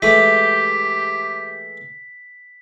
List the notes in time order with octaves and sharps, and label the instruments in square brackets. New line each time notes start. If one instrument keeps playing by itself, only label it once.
[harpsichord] E3 G#3 A3 [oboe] G4 [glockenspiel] B6